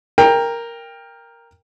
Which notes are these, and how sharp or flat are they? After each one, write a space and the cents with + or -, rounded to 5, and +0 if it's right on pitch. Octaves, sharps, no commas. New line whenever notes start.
A#4 +0 G5 +20